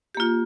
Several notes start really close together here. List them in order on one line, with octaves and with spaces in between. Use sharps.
G4 A#3 F4